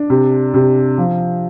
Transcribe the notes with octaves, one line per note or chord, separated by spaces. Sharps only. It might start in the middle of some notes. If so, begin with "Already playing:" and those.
Already playing: D4
C3
C3
F3